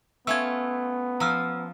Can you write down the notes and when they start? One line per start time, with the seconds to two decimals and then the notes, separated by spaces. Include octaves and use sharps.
0.27 A3 B3 C#4 F4 E6 G#6
1.20 F3 A#5 E6 F6